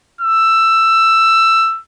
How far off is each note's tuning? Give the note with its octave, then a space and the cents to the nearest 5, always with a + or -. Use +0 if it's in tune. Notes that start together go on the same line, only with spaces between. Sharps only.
E6 +15